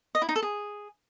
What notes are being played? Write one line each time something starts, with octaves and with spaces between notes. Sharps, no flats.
D#5
E4
D#4
A4
G#4